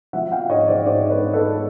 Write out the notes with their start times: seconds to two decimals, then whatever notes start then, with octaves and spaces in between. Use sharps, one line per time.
0.13 F3 E5 F#5
0.32 F5 G5
0.49 G#2 C#5 D#5
0.68 C5 D5
0.86 G#2 C5 D5
1.10 B4 C#5
1.22 G#2
1.33 A4 B4